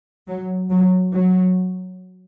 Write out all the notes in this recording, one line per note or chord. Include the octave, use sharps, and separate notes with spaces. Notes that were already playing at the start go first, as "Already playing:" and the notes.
F#3
F#3
F#3